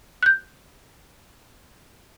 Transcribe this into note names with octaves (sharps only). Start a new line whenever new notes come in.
F#6 G6